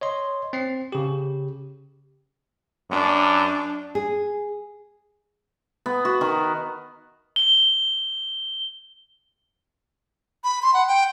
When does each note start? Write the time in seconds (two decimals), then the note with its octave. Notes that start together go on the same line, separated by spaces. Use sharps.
0.01 C#5 D#5 C6
0.53 C4 C7
0.92 C#3 G4
2.91 F#2 D4
3.95 G#4
5.86 B3
6.05 F#4
6.21 D#3
7.36 G7
10.44 B5
10.62 C6
10.74 F#5
10.88 G5